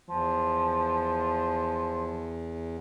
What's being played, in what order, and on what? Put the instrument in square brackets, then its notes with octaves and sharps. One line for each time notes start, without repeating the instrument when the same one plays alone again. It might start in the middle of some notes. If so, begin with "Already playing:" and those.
[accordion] E2 [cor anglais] F3